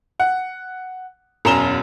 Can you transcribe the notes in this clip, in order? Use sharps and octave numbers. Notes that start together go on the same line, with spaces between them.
F#5
E1 F#2 A#5 E7 G7